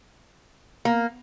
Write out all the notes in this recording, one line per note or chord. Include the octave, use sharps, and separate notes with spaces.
A#3